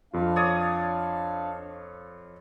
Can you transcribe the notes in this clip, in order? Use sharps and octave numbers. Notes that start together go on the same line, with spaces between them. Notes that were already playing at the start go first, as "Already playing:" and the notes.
F2 D4 F4 F5
C#5 D5 D#6